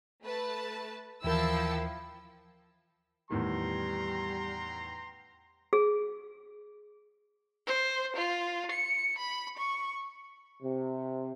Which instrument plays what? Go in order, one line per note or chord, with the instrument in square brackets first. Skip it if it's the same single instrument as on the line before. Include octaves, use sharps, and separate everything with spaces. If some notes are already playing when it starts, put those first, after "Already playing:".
[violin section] A3 B4 A5
[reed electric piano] D#2 E3 A#4 [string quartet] F3 E4 [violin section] G5 A5 E6
[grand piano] E2 A2 D#3 [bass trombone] G3 [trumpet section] G5 A#5 C6
[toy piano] G#4
[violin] C5
F4
C#7
B5
C#6
[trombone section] C3